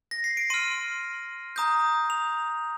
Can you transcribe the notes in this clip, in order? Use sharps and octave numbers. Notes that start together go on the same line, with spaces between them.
A#6
C7
D7
C6 F6 D#7
A#5 D#6 G6
F7